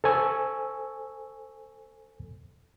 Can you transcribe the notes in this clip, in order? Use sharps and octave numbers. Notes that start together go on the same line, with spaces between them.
A4 C5 G#5 C#6 E6